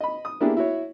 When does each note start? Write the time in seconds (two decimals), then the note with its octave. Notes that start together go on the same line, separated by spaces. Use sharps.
0.01 D#5 B5
0.25 D#6
0.41 A#3 B3 D4 E4 G4 G#4
0.57 E4 F#4 C#5